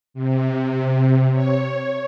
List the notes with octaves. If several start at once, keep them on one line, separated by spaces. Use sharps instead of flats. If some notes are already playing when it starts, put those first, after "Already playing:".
C3
C#5